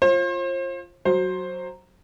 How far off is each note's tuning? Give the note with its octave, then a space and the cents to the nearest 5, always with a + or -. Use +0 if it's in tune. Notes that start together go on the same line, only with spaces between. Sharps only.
F4 +0 C5 +40
F#3 +0 C5 +15